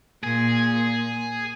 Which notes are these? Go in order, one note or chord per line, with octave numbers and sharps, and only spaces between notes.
A#2 G#4